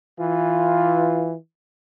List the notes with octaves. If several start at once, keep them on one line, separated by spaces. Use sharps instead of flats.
E3 F4